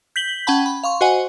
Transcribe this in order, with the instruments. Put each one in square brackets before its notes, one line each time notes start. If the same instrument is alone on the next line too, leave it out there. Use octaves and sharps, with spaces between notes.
[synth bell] G6 B6 F#7 G7
C#4 F#5 G5 A5 B5
B5
F5 C6 C#6
F#4 C5 D#5 F#5 G#5